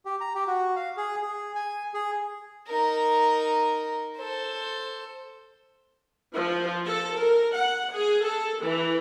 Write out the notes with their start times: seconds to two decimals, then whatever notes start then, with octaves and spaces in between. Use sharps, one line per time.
0.05 G4
0.21 A#5
0.35 G4
0.47 F#4
0.76 F5
0.97 G#4
1.22 G#4
1.55 G#5
1.94 G#4
2.67 D#4 A#4
4.16 A4 C5
6.34 F3
6.86 A4
7.17 A#4
7.55 F#5
7.93 G#4
8.23 A4
8.62 E3